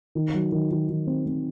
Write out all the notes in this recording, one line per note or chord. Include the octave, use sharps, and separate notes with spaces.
D#3
F#3
D#3
D#3
D#3
C4
C4